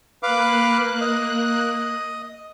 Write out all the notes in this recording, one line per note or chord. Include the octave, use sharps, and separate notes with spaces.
A#3 B4 F5 D6 F#6
D#5